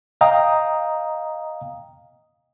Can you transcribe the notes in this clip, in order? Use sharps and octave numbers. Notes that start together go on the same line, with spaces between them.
D#5 F5 G5 A#5 D#6